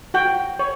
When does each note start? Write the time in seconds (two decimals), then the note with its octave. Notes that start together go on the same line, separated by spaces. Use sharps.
0.14 F#4 G5
0.59 C#5